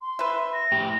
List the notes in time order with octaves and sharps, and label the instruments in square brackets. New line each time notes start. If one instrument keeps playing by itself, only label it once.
[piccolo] C6
[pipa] B4 E5
[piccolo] A#6
[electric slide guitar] A2 G4